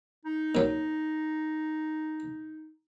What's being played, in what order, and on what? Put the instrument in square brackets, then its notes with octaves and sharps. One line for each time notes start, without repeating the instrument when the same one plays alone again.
[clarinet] D#4
[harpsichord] A#2 F#3